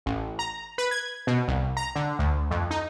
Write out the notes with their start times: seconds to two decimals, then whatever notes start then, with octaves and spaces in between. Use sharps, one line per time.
0.06 A1
0.39 A#5
0.78 B4
0.91 G#6
1.27 B2
1.48 C2
1.77 A#5
1.96 D3
2.19 D2
2.51 F2
2.71 D#4